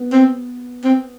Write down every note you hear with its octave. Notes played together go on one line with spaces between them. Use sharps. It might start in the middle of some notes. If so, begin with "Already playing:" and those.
Already playing: B3
C4
C4